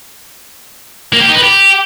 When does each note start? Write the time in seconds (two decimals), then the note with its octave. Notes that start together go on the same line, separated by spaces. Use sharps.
1.13 A#3
1.21 G4
1.28 D#4
1.36 B4
1.43 G4